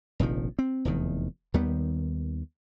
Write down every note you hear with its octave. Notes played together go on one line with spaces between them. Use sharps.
F1 A#1 D#3 F3
C4
F1 E2 D#3
D#2 D#3 G3 B3